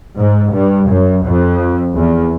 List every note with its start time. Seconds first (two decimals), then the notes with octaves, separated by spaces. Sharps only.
0.18 G#2
0.53 G2
0.89 F#2
1.25 F2
1.96 E2